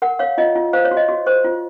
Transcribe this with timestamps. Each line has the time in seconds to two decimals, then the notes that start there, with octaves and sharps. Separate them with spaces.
0.02 A#4 F#5
0.19 C#5 F5
0.38 F4 D#5
0.55 F4
0.73 C5 F5
0.85 C#5
0.91 F#4
0.97 D#5
1.09 F#4
1.26 C5
1.44 F4